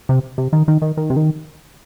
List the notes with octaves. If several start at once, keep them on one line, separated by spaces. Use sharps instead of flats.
C3
C3
D#3
D#3
D#3
D#3
C3
D#3